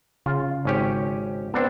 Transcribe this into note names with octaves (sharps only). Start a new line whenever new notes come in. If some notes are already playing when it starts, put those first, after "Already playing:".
C#3 F4
G#1 C#4 G4
B3 C4 D4 A4